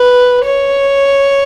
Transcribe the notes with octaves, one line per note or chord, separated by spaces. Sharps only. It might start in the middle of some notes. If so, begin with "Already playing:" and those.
Already playing: B4
C#5